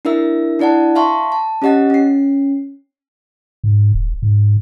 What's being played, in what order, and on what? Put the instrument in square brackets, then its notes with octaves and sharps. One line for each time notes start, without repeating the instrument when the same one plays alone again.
[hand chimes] D4 E4 A#4 E5 E6
D4 E4 D5 F#5 A5
E5 F5 A5 C6 C#6
A5
C#4 G4 D#5 F#5 A6
C#4 C7
[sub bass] G#2
D#1
G#2